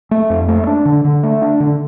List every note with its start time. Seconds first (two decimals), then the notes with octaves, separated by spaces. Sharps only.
0.11 A3
0.30 F2
0.48 A3
0.67 D4
0.85 D3
1.05 D3
1.23 A3
1.42 D4
1.60 D3